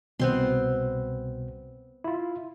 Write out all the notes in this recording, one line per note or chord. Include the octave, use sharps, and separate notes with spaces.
C2 B2 B3 C4 C6
E4 F4